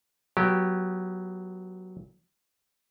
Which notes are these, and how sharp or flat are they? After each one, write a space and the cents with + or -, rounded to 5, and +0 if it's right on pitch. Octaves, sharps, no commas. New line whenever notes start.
F#3 +0 B3 -20 G4 -10